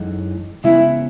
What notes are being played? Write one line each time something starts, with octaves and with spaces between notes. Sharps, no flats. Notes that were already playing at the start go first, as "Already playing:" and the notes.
Already playing: F#2 E3 G#3 D#4 A4
C#3 G#3 B3 E4